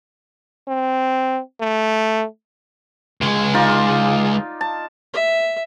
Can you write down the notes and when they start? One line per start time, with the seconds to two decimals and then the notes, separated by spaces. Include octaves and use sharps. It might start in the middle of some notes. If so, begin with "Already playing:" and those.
0.68 C4
1.60 A3
3.21 C#2 G#3
3.54 D#4 F4 D5
4.61 A5
5.13 E5